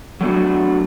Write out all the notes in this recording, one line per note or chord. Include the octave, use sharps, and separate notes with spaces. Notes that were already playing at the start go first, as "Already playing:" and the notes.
F#3 A3 B3 D4 F#4